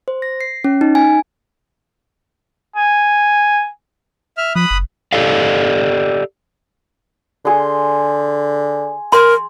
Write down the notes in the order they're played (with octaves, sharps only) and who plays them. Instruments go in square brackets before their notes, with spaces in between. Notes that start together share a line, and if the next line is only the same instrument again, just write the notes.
[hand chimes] C5
A#6
C7
C#4
D#4
G#5
[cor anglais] G#5
[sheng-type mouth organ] E5 F6
[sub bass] F3 [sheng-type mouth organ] B5 D#6 F#6
[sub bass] F#1
[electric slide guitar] G4 A4 D5 D#5 F5
[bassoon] D3 [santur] G#4 C6
[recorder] A#4 [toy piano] C6